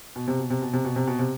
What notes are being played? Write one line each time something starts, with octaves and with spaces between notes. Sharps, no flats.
B2
C3
B2
C3
B2
C3
B2
C3
B2
C3